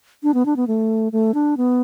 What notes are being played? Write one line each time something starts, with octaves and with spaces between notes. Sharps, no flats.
D4
B3
D4
B3
A3
A3
D4
B3